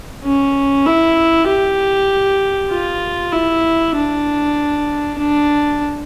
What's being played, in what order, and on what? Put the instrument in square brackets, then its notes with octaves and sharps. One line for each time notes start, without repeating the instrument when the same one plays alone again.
[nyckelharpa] C#4
E4
G4
F4
E4
D4
D4